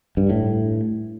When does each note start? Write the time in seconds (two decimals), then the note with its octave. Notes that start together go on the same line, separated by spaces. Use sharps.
0.17 G2
0.30 A2